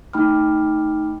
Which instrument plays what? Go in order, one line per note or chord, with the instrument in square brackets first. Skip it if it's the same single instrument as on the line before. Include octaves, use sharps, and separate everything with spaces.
[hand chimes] A3 D#4 G5 B5 D6 F6